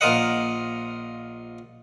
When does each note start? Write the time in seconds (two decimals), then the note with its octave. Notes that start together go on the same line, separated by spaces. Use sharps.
0.01 A#1 F4 A#4 C5 D#5 F#5